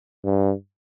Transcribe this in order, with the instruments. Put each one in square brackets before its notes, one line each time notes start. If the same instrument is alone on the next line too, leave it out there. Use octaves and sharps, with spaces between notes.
[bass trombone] G2